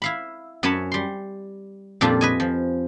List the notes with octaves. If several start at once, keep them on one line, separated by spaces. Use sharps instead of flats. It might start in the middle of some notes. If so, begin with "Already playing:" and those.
E4 F5 B5
F#2 F#3 C#4 C#5 A5 B5
G3 C6
F2 A#2 G3 D4 F4
B4 D#5 G#5
F3